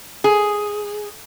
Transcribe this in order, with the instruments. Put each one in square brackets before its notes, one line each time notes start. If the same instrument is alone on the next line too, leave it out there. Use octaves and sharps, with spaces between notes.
[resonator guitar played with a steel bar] G#4